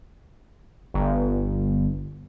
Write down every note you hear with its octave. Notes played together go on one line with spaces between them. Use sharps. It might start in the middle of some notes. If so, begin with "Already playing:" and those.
G1